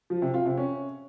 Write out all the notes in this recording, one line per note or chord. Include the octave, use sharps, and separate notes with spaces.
F3
C3
F4
C3
C#4